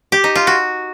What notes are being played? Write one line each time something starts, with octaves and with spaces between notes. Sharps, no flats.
G4
D#4
F4
F#4